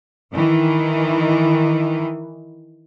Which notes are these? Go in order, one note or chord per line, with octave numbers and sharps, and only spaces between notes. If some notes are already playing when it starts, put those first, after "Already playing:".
D#3 E3